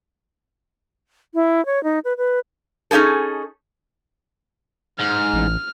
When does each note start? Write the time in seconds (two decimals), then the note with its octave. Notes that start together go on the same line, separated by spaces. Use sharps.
1.34 E4
1.66 C#5
1.84 D#4
2.05 B4
2.18 B4
2.91 C#4 D#4 E4 G#4 A4
4.99 G#2 F6
5.34 A1